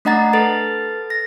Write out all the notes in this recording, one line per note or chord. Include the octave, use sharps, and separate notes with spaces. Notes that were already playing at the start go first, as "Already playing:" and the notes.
A3 D4 D#5 F#5 A#5 A6
A4 B4 A6
A#6